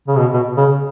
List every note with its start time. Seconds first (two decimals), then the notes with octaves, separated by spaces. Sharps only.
0.07 C#3
0.17 B2
0.33 B2
0.57 C#3